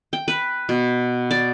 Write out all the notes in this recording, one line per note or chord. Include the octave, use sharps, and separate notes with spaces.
G5
B4
B2
D5